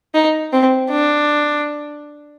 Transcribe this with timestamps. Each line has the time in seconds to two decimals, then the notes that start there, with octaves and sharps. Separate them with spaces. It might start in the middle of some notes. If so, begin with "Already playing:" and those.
0.14 D#4
0.53 C4
0.91 D4